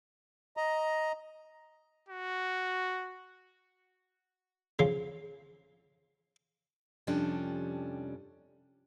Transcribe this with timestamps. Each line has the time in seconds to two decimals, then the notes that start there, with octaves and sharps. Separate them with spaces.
0.57 D#5 A#5
2.09 F#4
4.79 C#3 F3
7.07 F2 C3 F3 G3 C#4 D4